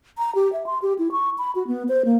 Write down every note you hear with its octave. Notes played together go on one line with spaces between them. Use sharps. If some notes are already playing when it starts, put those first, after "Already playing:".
A#5
G4
E5
C6
G4
E4
C#6
B5
F#4
B3
C5
A#3